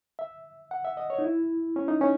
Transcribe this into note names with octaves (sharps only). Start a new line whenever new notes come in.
E5
F#5
E5
D#5
C#5
D#4
E4
C#4
D#4
C#4